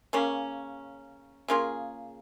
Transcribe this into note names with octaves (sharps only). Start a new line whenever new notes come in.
C#3 A#3 C#4
C#3 A#3 F4 G#4